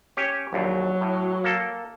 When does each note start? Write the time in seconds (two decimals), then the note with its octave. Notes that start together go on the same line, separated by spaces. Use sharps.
0.17 C#4 G4 C#5
0.53 A#1 D#2 F#3
1.01 A2
1.44 A#3 A4